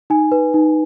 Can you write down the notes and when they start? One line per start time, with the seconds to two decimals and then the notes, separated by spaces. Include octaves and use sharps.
0.10 D#4 G#5
0.32 B4
0.54 D#4